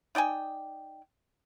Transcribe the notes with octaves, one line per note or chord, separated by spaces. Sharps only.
D#4 D5 G5 G#5